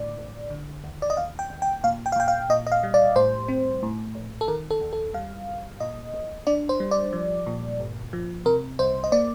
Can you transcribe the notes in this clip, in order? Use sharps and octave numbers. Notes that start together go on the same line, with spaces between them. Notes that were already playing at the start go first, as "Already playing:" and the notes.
Already playing: G1 A2 D3 D5
A1
D3
D#2
D5
D#5
D#2 F5
G5
D#2
G5
A#2 F5
G5
F5
A#2 G5
F5
A#2 D#5
D#5
F5
G3
D5
A2 C5
C4
A2
A#1
A4
D#3 A#4
A4
D#2
A4
G3 F5
G1
A#2 D#5
A#1
D4 D5
C5
G3
D5
F3
A#2
G1
F3
C3 A#4
C2 C5
D#5
A#3 D5